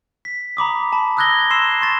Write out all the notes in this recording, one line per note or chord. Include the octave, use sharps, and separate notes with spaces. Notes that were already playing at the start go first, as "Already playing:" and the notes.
B6
A#5 B5 D6 D#6
A5 B5
D#6 E6 F#6 G#6 A#6 G7
C6 E6 C7 E7
C6 C#6 A6 E7